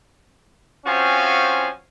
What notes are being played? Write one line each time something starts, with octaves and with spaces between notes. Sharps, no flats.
F3 C4 C#4 F#4 F5 G#5